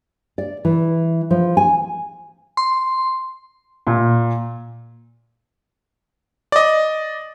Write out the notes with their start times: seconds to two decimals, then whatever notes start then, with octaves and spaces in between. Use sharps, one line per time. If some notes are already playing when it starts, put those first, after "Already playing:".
0.38 D5
0.65 E3
1.31 F3
1.57 G#5
2.57 C6
3.87 A#2
6.52 D5 D#5